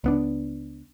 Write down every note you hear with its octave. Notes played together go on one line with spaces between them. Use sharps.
C#2 B3 D4